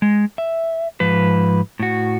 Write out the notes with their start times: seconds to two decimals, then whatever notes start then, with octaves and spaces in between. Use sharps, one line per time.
0.02 G#3
0.38 E5
1.00 G#2 F3 B4
1.80 A2 F#4